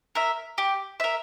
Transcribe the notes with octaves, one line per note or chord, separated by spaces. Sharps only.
A#4 E5
G4
A#4 E5